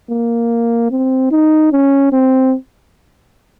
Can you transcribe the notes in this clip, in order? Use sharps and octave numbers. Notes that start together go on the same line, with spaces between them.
A#3
C4
D#4
C#4
C4